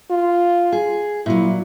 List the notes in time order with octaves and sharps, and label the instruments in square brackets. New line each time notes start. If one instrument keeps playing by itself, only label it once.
[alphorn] F4
[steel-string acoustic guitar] G#4
[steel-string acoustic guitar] A#2 F#3 [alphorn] E4